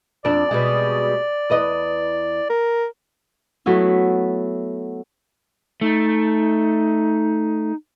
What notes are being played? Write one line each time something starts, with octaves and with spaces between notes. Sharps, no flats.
F2 D4 D5
B2 G3 G#3
E2 B4 D#5
A#4
F#3 A3 B3 E4
A3 D#4